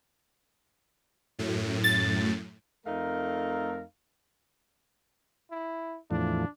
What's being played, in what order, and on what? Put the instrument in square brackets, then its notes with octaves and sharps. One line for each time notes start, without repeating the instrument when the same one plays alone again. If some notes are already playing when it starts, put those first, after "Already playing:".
[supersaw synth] F#2 A2
[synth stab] A6
[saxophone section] F2 A3 D#4 A#4 F5
[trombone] E4
[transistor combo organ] E2 A2 F3 [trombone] D4